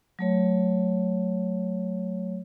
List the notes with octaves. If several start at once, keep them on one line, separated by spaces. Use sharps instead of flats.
F#3 A3 C#5